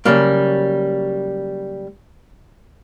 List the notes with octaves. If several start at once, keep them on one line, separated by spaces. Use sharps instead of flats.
C#3 F#3 G3 A#3